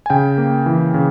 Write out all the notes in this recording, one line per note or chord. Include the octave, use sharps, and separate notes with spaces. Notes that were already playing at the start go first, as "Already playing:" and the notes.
G#5
C#3 G5
A#3
E3
C#3